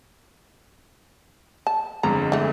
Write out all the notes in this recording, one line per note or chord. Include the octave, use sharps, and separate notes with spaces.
A5
G1 F2 G#3 A#5
E3 A3